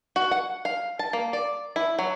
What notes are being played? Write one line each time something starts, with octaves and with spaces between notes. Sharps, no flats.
F#4
F#5
F5
A5
A#3
D5
E4
F#3